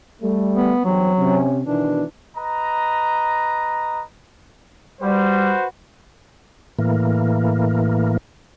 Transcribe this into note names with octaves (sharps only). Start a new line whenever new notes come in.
G3 A3
B3
E2 G2 F#3 C4
C3 C#4
B2 D#3 E3 D4
B4 D#5 A#5
G3 F#4 B4 C5
A2 E3 A#3